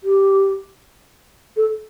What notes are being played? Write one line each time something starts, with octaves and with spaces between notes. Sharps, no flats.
G4
A4